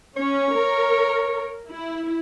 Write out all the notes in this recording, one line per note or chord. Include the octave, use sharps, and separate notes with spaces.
C#4 C#5
A#4
E4